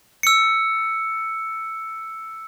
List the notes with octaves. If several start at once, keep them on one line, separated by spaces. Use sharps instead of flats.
E6 C#7